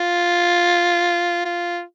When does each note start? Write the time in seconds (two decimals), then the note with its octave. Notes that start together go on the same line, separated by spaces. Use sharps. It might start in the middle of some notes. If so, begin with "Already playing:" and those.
Already playing: F4
1.45 F4